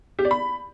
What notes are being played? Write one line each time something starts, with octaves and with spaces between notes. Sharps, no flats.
G4
D5
B5